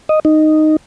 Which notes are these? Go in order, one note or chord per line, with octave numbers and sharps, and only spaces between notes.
D#5
D#4